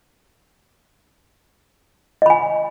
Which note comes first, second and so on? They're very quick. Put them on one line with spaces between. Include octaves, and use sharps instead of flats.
D#5 B5 G#5